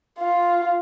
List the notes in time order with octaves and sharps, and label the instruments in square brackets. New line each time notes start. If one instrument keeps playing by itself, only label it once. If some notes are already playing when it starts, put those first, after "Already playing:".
[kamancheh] F4